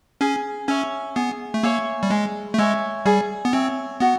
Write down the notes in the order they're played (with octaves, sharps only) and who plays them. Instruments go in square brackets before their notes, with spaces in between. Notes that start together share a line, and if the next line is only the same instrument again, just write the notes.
[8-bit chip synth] C#4 [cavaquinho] G#4
[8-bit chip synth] C#4 [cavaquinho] C#5 E5 G#5
[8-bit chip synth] B3 [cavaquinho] G#4
[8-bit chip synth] A3
[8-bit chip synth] A#3 [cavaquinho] C#5 E5 G#5
[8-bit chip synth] G3
[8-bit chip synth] G#3 [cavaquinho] G#4
[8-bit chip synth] A3
[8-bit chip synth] G#3 [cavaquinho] C#5 E5 G#5
[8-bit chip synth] G3 [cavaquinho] G#4
[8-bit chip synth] B3
[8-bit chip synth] C4 [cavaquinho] C#5 E5 G#5
[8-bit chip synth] B3 [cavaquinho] F#4